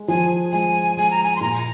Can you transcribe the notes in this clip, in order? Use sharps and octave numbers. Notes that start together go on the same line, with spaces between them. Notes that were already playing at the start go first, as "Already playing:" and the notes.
Already playing: G#3
F3 G#5
G#3 G#5
G#3 G#5
A#5
G#5
C6
A#2 A#5